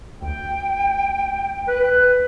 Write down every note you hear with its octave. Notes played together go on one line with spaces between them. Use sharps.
D2 G5
B4 F#6